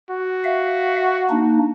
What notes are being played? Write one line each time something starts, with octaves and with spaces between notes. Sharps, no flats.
F#4
E5 F5
A#3 D4 D#4